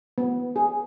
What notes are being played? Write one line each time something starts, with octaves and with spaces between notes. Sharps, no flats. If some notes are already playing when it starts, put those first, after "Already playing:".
B3
G#4